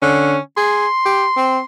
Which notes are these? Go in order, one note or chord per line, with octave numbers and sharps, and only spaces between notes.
D3 C#4
G#4 C6
G4
C4